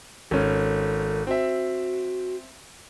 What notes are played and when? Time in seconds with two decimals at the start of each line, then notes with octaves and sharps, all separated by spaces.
0.31 G#1 C#4 A4
1.27 C4 F#4 E5